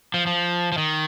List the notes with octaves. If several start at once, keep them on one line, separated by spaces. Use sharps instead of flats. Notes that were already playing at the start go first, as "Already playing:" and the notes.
F3
F3
F3
D#3